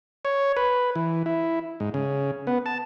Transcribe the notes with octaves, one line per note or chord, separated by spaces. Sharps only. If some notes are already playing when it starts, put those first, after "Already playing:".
C#5
B4
E3
E4
G#2
C#3
B3
A5